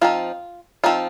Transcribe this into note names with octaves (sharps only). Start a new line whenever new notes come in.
F3 C4 D#4 F4
F3 C4 D#4 F4